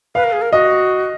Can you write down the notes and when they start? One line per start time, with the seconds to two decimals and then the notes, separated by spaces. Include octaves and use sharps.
0.15 B4 F5
0.24 A#4
0.32 G#4
0.42 A#4
0.52 F#4 D#5